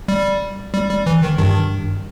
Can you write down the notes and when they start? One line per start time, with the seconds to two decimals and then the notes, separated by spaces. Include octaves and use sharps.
0.08 G3
0.74 G3
0.90 G3
1.06 E3
1.22 D#3
1.38 G2 D#3